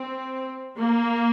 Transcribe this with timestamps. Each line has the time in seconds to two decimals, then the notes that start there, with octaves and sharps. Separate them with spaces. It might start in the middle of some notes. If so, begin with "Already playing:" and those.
Already playing: C4
0.78 A#3